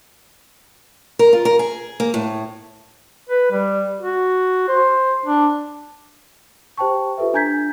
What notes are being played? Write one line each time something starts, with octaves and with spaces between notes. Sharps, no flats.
A#4
F4
A#4
G#4
A#3
A2
B4
G3
F#4
C5
D4
G4 C5 G5 A5 C#6
F4 G4 A4 B4 E5
D4 G#5 A#5 G6 G#6 B6